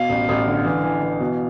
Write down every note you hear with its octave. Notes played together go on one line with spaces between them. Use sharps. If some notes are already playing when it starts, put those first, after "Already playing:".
Already playing: B2 F5
A1
A1
D3
E3
E3
E3
B2